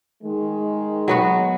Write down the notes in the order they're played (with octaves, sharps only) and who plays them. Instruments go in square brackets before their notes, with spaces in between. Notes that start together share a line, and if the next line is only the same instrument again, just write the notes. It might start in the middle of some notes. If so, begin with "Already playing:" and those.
[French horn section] D#3 G#3
[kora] F#3 B3 F#4